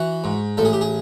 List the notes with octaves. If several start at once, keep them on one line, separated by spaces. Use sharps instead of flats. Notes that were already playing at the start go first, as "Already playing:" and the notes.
Already playing: E3 F#4
G#2
A1 A4
G#4
G4
G#4